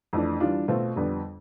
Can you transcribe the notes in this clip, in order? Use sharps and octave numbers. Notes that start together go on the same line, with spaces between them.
F2 E3 A3 D4
E3 G3 D4 F4
B2 A3 C4 F4
F2 D3 G3 B3